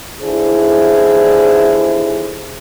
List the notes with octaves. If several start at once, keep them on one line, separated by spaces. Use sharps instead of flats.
D#2 D3 E3 E4 G#4 C5